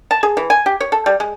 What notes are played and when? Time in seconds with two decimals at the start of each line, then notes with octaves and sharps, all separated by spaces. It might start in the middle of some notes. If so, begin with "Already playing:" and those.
0.11 A5
0.23 G#4
0.37 E3
0.50 G#5
0.66 G4
0.80 C#5
0.92 A4
1.06 G3
1.20 G#3